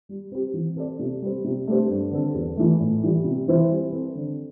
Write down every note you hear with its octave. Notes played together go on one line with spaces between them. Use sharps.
G3
C4 G4
E3
C4 A4 D5
C3
G3 C4
C3
A3 D4 G4 C5
G2
D3 C4 A4
E2
E3 A3
A2
E3 G3
C3
E3 C4 E4 C5
G3
C4 A4
D3